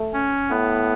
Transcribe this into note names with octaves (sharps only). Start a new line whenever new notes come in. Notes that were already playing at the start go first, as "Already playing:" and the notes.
Already playing: A3
C#4
A2 B3